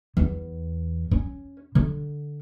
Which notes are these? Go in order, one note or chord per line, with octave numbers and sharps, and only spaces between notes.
E2
C#4
D3